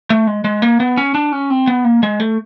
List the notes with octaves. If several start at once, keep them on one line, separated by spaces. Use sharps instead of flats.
A3
G#3
G#3
A#3
B3
C#4
D4
C#4
C4
B3
A#3
G#3
A3